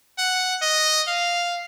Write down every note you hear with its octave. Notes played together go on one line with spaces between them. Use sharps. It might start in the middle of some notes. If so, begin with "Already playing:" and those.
F#5
D#5
F5